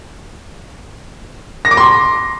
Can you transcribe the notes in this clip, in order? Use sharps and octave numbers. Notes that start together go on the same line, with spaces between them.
A#6
D6
C6